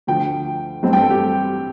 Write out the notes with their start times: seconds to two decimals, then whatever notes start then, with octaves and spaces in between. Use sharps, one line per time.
0.07 D2 D3 F3 G5
0.83 A1 G2 G3 C4
0.93 G5
1.01 A4
1.10 G4